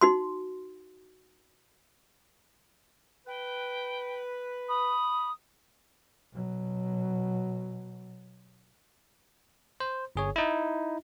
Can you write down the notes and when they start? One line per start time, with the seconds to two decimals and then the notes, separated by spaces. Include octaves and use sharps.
0.01 D#4 F#4 C6
3.27 B4 G5
4.68 B5 D#6
6.33 B2 F#3
9.80 C5
10.16 G1 G#4 C#5
10.36 D#4 E4